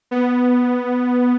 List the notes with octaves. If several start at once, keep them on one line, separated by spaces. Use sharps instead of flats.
B3